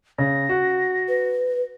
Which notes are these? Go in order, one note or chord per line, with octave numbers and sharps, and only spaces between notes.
C#3 A#6
F#4
B4